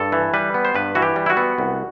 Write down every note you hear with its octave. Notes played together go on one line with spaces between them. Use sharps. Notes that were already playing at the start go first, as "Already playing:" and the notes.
Already playing: G2 A4
E3
G3 B4
B3
C5
G2 B4
E3 F#4
G4
G3
E4
F#4
B3
C2